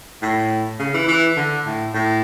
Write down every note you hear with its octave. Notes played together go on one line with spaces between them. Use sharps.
A2
C#3
E3
E3
D3
A2
A2